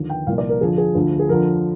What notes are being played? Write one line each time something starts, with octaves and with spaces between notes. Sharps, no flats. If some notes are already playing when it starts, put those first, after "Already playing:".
Already playing: D#2 D3 F3
G5
C2 A#2 F3 F5
D5
A#4
F2 D3 F3 G#4
G#4
D2 D3 F3
G#4
F2 D3 F3 A#4